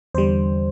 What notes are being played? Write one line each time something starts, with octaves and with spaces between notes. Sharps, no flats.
E2 D3 G3 C5